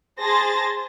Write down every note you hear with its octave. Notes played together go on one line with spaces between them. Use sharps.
G#4 C5 A5 C6 A6 A#6